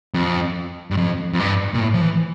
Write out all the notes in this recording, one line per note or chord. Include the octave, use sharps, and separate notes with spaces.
F2
G2
F2
F2
G2
A#2
A2
F3
E3